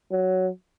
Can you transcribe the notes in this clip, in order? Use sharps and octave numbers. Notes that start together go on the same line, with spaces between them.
F#3